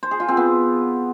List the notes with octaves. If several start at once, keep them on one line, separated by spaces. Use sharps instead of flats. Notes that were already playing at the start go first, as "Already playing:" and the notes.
C5
G#4
F4
C4
B3